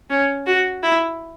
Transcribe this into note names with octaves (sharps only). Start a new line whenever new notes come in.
C#4
F#4
E4